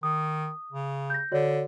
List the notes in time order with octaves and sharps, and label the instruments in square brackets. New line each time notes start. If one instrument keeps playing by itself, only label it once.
[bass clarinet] D#3 [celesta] D#6
[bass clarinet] C#3
[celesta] G6 A#6
[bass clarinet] D3 [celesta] F#4 C#5 D5